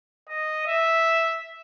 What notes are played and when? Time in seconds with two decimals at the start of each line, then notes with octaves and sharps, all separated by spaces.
0.29 D#5
0.66 E5